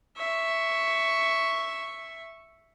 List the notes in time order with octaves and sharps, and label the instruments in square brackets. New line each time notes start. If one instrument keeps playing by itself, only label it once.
[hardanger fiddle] E5 C#6